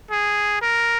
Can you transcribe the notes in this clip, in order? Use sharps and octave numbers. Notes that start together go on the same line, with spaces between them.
G#4
A#4